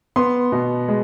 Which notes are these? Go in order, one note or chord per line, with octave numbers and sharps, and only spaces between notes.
B3 C6
B2
G#3